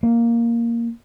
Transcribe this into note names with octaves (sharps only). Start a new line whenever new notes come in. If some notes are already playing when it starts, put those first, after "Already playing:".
A#3